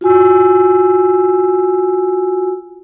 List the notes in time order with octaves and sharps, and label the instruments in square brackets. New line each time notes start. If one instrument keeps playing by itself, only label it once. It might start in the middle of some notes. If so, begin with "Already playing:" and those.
[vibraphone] F4 F#4 G#5 E6